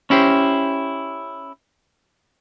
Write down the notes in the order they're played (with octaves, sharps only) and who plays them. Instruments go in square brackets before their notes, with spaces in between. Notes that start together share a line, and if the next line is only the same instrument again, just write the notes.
[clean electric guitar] C#4 E4 G4 C5